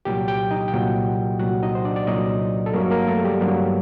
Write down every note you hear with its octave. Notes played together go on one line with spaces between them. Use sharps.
C2 A#2 F#3 G4 G5
G4 G5
D#4 D#5
G5
C2 A#2 F#3 F#4 F#5
C2 A#2 F#3 F#4 F#5
D#4 D#5
C5
D4 D5
D5
C2 A#2 F#3 D#4 D#5
A4
G2 F#3 A#3 A#4
A#3 A#4
A3 A4
G3 G4
G2 F#3 A#3 F#4